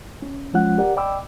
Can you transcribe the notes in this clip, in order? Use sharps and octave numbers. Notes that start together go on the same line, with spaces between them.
C#4
F3 G#3 C#4 F4 F#5 F#6
G4 A#4 D5 F#5
D5 D#5 G5 B5 D6 E6